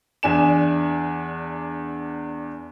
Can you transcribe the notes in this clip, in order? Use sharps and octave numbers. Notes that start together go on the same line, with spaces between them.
E2 D4 G#5 E7